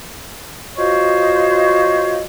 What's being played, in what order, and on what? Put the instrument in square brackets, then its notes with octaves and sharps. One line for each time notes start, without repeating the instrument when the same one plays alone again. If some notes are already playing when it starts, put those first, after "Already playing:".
[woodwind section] F4 F#4 C5 C#5 D#5